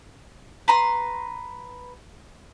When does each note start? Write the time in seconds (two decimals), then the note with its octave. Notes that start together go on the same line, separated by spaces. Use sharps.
0.68 B4 A#5 C6